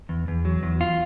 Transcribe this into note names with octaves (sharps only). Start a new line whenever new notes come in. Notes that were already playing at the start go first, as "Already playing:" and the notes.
E2
E2
F#3
E2
F4